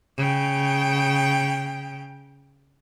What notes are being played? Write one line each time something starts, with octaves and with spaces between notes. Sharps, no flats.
C#3 G5